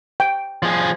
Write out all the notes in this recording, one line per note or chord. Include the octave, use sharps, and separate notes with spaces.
G5
F3 G#4